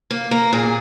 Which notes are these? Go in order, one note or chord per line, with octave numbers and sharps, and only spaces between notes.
A#3
A#3 A#4
A#2 G#4